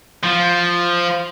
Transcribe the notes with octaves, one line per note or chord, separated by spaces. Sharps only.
F3